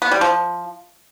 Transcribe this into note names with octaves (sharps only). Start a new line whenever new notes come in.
B3
G3
F3